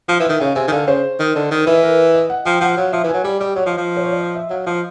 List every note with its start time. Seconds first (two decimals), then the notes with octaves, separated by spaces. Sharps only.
0.08 F3 F5
0.20 E3
0.25 D#3 E5
0.40 C#3 F5
0.55 C3 G#5
0.67 D#3
0.71 D3 F5
0.88 C#3 C5
1.19 D#3
1.36 D3
1.51 D#3
1.66 E3 B4
1.83 A#4
2.14 D#5
2.30 F#5
2.45 F3 G5
2.61 F3 F#5
2.77 F#3 F5
2.92 F3 E5
3.04 E3
3.09 F#3 G#5
3.24 G3 D5
3.40 G3 D#5
3.56 F#3 C#5
3.66 F3
3.72 D#5
3.77 F3
3.97 C5
4.04 C#5
4.12 D5
4.20 D#5
4.35 E5
4.50 F#3 F5
4.66 F3 D#5